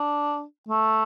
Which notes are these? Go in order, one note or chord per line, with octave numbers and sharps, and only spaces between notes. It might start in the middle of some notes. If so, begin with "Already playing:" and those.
Already playing: D4
A3